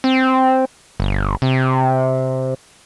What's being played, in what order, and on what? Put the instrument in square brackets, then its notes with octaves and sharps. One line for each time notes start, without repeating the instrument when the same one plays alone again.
[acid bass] C4
G1
C3